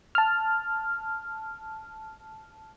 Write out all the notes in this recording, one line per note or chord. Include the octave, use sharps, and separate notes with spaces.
A5 F6